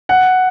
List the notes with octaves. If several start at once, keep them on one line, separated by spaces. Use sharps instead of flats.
F#5